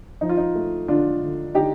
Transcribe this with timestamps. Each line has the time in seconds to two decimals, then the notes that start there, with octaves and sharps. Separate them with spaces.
0.21 F3 D#4
0.29 F4
0.37 D#4
0.55 A3
0.88 D3 D4 F4
1.21 D3
1.55 D3 D#4 G4